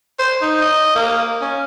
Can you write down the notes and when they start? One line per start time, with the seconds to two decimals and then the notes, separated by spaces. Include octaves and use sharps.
0.19 C5
0.41 D#4
0.61 D#5
0.95 A#3
1.42 C#4